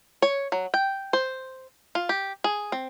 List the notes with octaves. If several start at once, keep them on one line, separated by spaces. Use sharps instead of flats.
C#5
F#3
G5
C5
F4
G4
G#4
C4